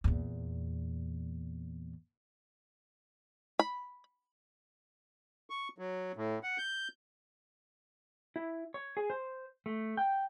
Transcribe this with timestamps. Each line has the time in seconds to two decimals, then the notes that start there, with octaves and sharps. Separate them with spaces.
0.04 E2 A#2
3.59 B5
5.50 C#6
5.78 F#3
6.16 A2
6.43 F#5
6.58 G6
8.36 E4
8.74 C#5
8.97 G#4
9.10 C5
9.66 A3
9.97 G5